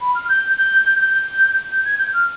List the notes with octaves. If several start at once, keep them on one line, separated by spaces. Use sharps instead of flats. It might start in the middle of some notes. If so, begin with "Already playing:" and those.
B5
F6
G6
G6
G6
G6
G6
G6
G#6
G6
F6